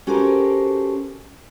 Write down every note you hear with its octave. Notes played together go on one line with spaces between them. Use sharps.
C#4 F#4 G4 A4 A#4 C5